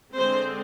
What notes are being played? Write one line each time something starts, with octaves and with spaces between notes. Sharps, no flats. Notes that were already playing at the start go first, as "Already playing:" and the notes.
D3 G#3 C4 C5